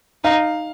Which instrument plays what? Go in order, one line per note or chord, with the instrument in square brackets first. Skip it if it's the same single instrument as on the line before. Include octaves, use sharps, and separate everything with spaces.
[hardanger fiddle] D#4 [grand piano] F5